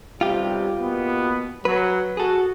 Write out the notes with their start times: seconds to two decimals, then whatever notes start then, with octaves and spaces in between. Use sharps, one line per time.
0.21 B1 C3 G3 F4 G4
0.79 B2 A#3 B3
1.65 F#3 B4
2.17 F#4 G#4 A4